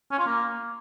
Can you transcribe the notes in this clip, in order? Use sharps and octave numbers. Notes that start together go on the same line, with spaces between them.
C#4
F4
A#3